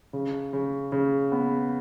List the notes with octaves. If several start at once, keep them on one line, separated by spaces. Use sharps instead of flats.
C#3
C#3
C#3
B3